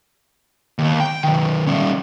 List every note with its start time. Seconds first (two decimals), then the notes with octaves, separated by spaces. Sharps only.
0.79 D#2
1.00 G5
1.24 D#3 F#3
1.67 G3 C#4